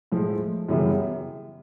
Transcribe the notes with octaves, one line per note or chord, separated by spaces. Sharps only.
A2 F3 G#3
F#2 C#3 E3 G3 B3